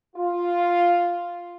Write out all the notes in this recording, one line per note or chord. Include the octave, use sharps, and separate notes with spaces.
F4